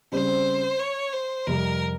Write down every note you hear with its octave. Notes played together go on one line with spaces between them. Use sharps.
C#3 G3 C4 C5
C#5
C5
F2 C3 G3 A#4